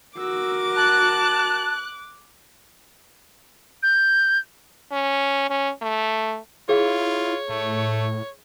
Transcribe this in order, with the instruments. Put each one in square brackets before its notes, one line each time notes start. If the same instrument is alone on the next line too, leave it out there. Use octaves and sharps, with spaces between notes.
[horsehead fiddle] F#4 A#4 [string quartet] D6 [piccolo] E6
[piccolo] A5 [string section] F#6
[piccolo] G6
[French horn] C#4
C#4
A3
[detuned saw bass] E4 [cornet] F4 [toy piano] G#4 F5 [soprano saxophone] C#5
[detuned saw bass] A2 [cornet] A3